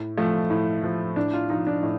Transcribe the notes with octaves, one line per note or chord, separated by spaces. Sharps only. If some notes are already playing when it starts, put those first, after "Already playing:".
Already playing: A2
F3 A3
A2
F3
A2 D4
F4
F3 D#4
D4
A2